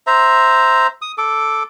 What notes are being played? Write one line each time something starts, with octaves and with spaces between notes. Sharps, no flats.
C5 E5 A#5
D#6
A4 D6